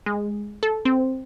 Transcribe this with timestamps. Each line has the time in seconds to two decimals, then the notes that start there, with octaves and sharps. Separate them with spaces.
0.06 G#3
0.63 A4
0.85 C4